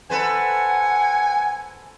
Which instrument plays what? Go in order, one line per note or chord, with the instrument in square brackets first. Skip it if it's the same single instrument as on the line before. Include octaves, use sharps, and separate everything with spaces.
[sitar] A4 B4 C5 [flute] F#5 [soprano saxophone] G#5